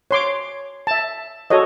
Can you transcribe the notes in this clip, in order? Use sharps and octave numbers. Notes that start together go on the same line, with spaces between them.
C#5 C6 D6
E5 A5
F#4 A4 C#5 D#5